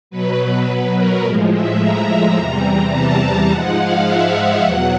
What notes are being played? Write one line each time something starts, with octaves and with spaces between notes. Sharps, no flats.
B2 F#3 B4
B4
A#4
A2 F3 G#3
E5
A#5
E2 C3 E3 G3 A#5
A5
G#2 F3 G#3 F#5
F5
E5
F5
E2 B2 F#3 F#5